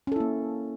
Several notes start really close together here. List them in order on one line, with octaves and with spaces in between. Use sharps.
C#4 A4 E4 A#3